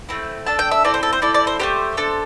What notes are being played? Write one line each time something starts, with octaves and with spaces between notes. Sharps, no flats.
A3 C4 E4
D4 A4 A5
G5
E5
C4 E4 A4 D5
C5
A4
C5
C4 E4 A4 D5
D5
C5
A3 D4 G4 C5
D4 A4